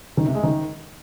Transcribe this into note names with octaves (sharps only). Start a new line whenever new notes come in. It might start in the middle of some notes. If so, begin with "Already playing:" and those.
D#3
C3
G#3
D#3